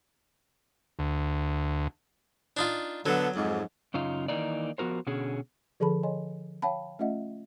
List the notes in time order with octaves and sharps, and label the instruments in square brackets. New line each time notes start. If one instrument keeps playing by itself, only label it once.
[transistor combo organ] D2
[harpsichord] D4 D#4 F4
[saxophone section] D3 B3 A4 [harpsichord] F#3
[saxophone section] F2 G#2
[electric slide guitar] F#2 C#3 D#4 F4
D#3 E3 A#3 D#4 D5
F3 B3 F#4 A#4 C5
B2 D3 C#4 G#4
[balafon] D3 F3 G#4 A4 A5 B5
C#5 D#5 G#5 C6
C#5 F5 G5 A5 B5
A3 C#4 F4 D#5 E5 F#5